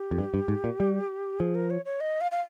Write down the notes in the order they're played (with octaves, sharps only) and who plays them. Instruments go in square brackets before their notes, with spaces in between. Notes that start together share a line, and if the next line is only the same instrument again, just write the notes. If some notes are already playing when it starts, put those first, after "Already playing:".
Already playing: [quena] G4
[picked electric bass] F2
G2
G2
G#2
A#2
G3
[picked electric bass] F3 [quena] G#4
[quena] A#4
C#5
C#5
D#5
F5
F5